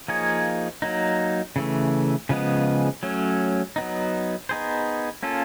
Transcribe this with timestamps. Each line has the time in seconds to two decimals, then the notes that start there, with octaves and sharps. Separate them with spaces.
0.08 F3 A#3 D#4 G#4 C#5
0.82 F#3 A#3 D#4
1.56 C#3 E3 A3
2.29 C#3 F3 G#3 B3
3.03 F#3 A3 C#4
3.76 F#3 B3 D#4
4.49 B3 D#4 G#4 C5
5.23 A#3 C#4 F4 A4